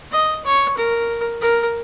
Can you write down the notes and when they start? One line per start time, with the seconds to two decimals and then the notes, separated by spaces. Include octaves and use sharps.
0.12 D#5
0.44 C#5
0.77 A#4
1.41 A#4